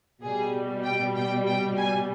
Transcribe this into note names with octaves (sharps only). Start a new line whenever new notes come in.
B2 G3 G#4
G5
G5
G5
G#5